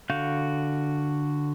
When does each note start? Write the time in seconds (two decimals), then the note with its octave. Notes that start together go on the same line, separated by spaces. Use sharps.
0.10 D3 F#4 F5 G6